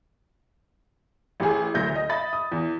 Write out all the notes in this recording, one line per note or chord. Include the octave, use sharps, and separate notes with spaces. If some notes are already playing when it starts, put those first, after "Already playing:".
A1 G4 G#4
F#1 D2 G6 A#6
D#5
D#5 E5 B5 A6
D#6
E2